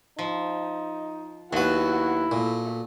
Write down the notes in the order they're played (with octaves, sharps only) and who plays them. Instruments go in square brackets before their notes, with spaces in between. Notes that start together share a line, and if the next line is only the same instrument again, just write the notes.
[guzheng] F3 [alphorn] D#4
[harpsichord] D#2 B4 [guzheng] F#3 B3 [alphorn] E4 [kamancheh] F#4 F#5
[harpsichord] A#2 [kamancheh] A3